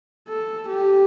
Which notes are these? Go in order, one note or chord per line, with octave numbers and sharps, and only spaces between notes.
A4
G4